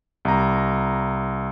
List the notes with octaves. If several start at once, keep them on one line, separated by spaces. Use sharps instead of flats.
C2 A#5